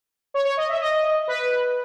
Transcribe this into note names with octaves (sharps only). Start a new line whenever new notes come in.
C#5
C#5
D#5
E5
D#5
B4